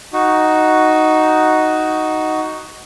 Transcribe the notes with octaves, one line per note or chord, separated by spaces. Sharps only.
D#4 F#4